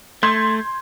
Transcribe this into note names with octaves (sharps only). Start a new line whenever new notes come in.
A3 C6 G6 G#6